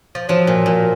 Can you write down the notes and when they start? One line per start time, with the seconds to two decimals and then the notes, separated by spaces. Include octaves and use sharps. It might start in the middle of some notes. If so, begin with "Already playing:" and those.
0.15 F3
0.29 F3 F#3
0.47 A#2
0.66 A#2